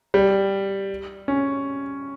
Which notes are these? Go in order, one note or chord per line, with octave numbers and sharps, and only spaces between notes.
G3
C#4